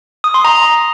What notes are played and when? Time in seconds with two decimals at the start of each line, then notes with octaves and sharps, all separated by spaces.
0.24 D#6
0.34 C6
0.45 A#5